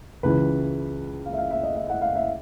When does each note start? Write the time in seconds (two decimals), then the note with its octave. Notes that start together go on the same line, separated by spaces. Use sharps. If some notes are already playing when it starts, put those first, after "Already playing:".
0.23 C#2 C#3 E3 B4
1.25 F5
1.33 E5
1.38 F5
1.51 E5
1.63 D#5
1.76 E5
1.90 F#5
2.02 F5
2.15 E5